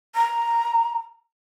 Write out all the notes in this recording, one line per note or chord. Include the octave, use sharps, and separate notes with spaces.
A#5